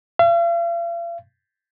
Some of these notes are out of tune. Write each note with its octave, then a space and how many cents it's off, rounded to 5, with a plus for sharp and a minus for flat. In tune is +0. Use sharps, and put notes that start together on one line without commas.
F5 -45